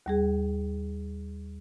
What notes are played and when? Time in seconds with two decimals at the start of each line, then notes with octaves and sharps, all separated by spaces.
0.06 D#2 G3 G#4